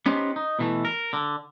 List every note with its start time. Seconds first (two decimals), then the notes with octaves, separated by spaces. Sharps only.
0.06 B3 C#4 D#4 G4 C5
0.36 D#4
0.59 B2 E3 A3
0.85 A#4
1.13 D3